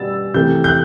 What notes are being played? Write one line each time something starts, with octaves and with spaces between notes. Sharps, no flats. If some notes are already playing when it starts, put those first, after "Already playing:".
Already playing: B2 G3 B3 E6 A6
C3 E3 A3 G6
G6
F#6